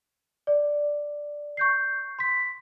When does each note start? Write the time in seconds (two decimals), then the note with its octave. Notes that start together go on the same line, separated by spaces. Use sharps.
0.47 D5
1.57 C#6 G6 C7
2.19 C6 B6